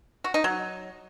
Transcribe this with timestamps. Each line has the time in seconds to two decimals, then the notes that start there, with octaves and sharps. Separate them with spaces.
0.24 F#4
0.34 D#4
0.44 F#3